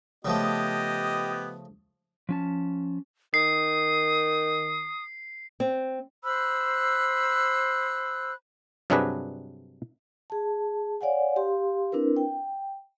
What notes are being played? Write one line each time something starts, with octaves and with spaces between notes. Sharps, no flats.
C#3 F3 A3 B3 G4 D#5
F3 C#4 A5
D#3 D#6 C7
C4
C5 B5 E6 F#6
G2 C3 F#3 D4 G#4 B4
G#4 A5
C#5 D5 F5 F#5 G#5
G4 F5 C6
C4 D4 E4 A#4 B4
G5